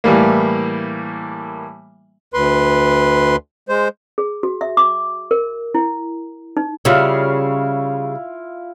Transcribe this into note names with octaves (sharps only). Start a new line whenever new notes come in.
A2 E3 G3 A#3
D2 B4 C6
G#3 C5
G#4
F#4
E5
D6
A#4
E4
D#4
C#3 G3 E4 F4 F5